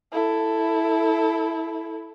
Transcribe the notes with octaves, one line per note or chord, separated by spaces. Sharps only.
E4 A4